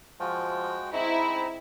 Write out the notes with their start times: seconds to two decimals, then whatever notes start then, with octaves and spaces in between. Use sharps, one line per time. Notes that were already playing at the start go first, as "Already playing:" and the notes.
0.20 F3 G#3 F#4 G5
0.93 G#2 C4 D#4 E4 A#5